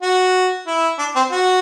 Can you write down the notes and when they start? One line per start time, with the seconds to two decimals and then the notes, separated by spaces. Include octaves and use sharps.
0.02 F#4
0.67 E4
0.99 D4
1.16 C4
1.32 F#4